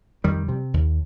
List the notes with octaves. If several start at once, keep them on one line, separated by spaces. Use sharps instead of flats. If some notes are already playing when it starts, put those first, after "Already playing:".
F2 D#3 G3
C3
D#2